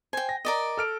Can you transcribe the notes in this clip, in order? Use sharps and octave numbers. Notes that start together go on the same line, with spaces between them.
C5 G5 G#5
A#6
A#4 D5 D#5
A4 F6 D7